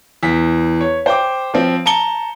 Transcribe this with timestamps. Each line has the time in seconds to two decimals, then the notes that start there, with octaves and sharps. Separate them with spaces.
0.23 E2 B6
0.81 C#5
1.06 C5 G5 D6
1.54 F3 C4
1.86 A5 A#5 C#7 G7